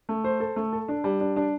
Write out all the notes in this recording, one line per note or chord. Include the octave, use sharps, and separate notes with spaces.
A3
C5
A4
A3
A4
D4
G3
D4
D4